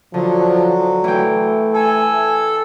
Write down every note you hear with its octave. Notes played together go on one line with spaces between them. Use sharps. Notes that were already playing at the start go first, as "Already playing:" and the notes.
D3 F3 F#3
E3 A3 G5
A4 G#5